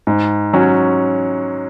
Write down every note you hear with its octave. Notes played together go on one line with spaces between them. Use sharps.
G#2
F#3 C#4